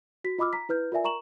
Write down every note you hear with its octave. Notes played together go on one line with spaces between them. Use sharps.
F#4 B6
F4 D#5 B5 D6 E6 F6
A#5 B6
E4 B4 F6 G6
F4 A#4 D5 E5 G#5
A#4 A#5 C#6 E7 F#7